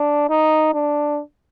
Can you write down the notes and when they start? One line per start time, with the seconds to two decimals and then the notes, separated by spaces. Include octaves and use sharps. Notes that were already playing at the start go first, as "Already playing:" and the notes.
Already playing: D4
0.30 D#4
0.74 D4